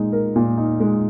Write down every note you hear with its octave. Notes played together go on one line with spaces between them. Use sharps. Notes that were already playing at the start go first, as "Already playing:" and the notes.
Already playing: A#2 G#3 D#4
A#4
A#2
D#4
G#3